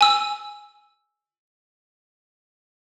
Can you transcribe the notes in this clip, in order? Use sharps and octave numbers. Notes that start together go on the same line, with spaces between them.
G#5 E6